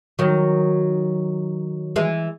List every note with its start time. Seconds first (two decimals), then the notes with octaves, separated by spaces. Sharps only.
0.19 D#3 F#3
1.96 E3 G#3